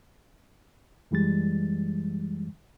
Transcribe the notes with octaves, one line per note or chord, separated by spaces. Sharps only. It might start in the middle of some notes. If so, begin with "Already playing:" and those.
F#2 E3 G3 G#3 A6